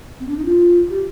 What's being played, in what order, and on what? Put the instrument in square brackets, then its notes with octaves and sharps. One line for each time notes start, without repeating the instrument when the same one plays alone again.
[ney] C4
D4
D#4
F4
G4